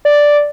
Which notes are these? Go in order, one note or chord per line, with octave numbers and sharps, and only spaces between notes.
D5